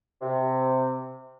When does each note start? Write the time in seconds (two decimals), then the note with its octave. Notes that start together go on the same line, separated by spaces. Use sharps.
0.22 C3